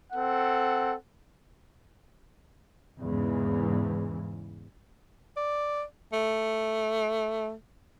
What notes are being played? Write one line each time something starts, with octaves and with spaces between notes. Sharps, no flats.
C4 A4 F#5
E2 G#2 C#3 E3
D5
A3